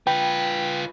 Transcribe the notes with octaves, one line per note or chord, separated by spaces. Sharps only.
F4 B4 G5